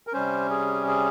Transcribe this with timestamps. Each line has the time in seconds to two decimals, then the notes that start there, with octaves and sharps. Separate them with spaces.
0.07 A#4
0.13 C3 G3 C#4 C5
0.50 G#4
0.87 G#4